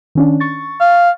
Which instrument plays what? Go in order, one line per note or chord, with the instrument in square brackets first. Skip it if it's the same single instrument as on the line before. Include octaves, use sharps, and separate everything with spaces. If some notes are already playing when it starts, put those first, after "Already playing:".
[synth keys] D#3 C#4 D4
C#6 A6
[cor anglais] F5